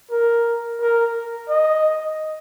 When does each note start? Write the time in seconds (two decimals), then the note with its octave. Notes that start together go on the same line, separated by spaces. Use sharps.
0.10 A#4
0.80 A#4
1.49 D#5